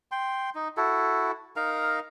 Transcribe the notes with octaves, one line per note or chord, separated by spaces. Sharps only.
G5 C6
D#4
E4 F#4 A4
D#4 A#4 F5 A#5